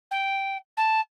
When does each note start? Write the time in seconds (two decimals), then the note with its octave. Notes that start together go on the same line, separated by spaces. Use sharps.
0.11 G5
0.77 A5